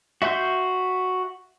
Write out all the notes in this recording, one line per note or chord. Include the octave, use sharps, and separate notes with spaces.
F#4 E5 C6 G6